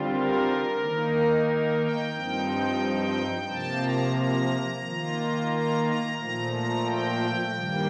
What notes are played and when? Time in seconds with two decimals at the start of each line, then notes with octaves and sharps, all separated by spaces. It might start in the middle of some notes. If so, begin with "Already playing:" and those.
Already playing: D3 G3 C4 F4
0.12 A#4
0.80 D#3 A#3 D#4
1.47 A#4
1.81 G5
2.14 G2 F3 C4 D#4
3.49 C3 F3 A#3 A5
3.83 A#5
4.16 A#5
4.84 D#3 A#3 F4
5.51 A#5
5.85 A#5
6.18 A#2 F3 A3 A#5
6.52 A#5
6.85 G5
7.53 G2 D#3 G3 A#3